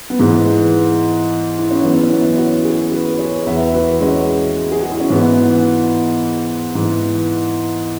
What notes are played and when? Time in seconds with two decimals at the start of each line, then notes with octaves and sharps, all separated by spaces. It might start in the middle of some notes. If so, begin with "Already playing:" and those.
0.10 B3
0.19 G#2 E3 G#3
1.59 E4
1.71 C#4
1.83 F#2 E3 B3
2.03 C#4
2.09 B3 E4
2.37 C#4 F#4
2.65 E4 G#4
2.92 F#4 B4
3.19 G#4 C#5
3.46 E2 E3 B4 E5
3.73 F#4 B4
4.01 G#3 C#4
4.72 G#4
4.81 F#4
4.91 E4
5.00 C#4
5.10 G#2 E3 B3
6.75 G#2 E3